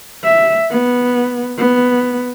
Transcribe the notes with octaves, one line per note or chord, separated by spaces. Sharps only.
E5
B3
B3